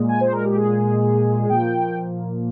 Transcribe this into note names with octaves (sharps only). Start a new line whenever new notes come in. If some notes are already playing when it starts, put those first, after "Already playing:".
Already playing: A#2 G#3
G#5
C5
A#4
G4
G#4
A#2 F3 A#3 G5